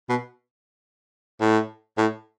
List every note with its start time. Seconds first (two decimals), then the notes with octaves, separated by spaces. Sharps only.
0.09 B2
1.41 A2
1.98 A2